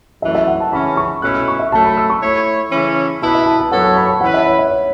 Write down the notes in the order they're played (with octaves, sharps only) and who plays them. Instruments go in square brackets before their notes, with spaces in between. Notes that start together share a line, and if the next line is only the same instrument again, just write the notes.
[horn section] F#2 E3 A3 [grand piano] E5
[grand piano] E5
F#5
A5
[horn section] C#3 E3 C#4 [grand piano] B5
[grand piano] C#6
[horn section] B2 A3 C#4 E4 B4 [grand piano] F#6
[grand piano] E6
C#6
E5
[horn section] F#2 F#3 A3 [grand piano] A5
[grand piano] B5
E6
C#6
[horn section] A3 E4 C#5
C#3 E3 C#4 E4
[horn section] B2 B3 E4 B4 [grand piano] A5
[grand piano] E5
A5
A5
[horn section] F#2 F#3 B3 A4 C#5 [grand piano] F#5
[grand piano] A5
B5
A5
[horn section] E3 C#4 E4 B4 [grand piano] F#5
[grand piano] E5
C#5
E5
C#5